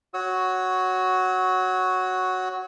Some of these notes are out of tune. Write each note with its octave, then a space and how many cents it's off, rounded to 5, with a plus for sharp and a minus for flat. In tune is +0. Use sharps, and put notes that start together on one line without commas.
F#4 +0 C#5 +0 E6 -40